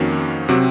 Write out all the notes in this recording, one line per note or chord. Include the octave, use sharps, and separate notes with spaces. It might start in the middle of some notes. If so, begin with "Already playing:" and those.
Already playing: F2 D#3 A#3 C#4 F#4
C3 F#3 C4 F#4